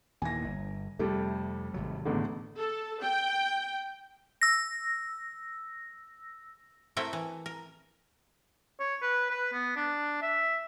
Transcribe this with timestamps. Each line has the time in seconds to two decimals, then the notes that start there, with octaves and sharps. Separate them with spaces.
0.22 D#2 A#2 E3 G#5 A#6
0.44 G1
0.99 F2 C3 G3 A3
1.74 G#1 C3 F#3
2.05 A1 E2 D3
2.57 A4
3.02 G5
4.42 E6 A#6
6.97 A3 C4 E4 F#4 A#4 G5
7.13 E3
7.46 A#4
8.80 C#5
9.02 B4
9.31 B4
9.53 B3
9.76 D4
10.22 E5